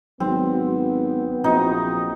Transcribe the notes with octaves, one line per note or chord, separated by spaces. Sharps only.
G#1 F#3 B3 C4
A#1 C4 D#4 E4 F#4